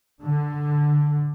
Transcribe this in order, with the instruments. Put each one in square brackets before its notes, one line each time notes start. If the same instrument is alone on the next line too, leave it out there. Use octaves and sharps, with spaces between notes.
[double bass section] D3